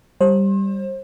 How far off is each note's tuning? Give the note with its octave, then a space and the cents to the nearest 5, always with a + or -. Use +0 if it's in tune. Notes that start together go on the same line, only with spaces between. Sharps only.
G3 +0 C5 +35